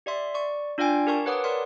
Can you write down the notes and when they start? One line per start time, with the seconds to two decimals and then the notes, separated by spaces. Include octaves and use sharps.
0.06 G4 D5 E5 C6
0.34 D5 C#6
0.78 D4 F4 D5 F5 G5 G#5
1.07 G4 A#4 F5 A5 C#6
1.26 G4 B4 C#5 F#5 D6 D#6
1.44 A#4 D5 C6